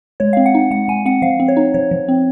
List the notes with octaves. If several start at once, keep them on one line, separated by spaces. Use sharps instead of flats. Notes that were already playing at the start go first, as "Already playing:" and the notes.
G#3 C#5
C4 F5
F#5
D#4
G#3 F#5
G#3 G#5
C4 F#5
F3 F5
C4
C#5
D#4
F3 C#5
F3
C4